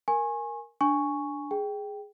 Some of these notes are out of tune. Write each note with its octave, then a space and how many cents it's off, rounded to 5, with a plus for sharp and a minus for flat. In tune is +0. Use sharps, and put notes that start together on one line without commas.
A#4 +0 G#5 +0 C#6 -40
D4 +0 G#5 +0 C#6 +0
G#4 +0 G5 +0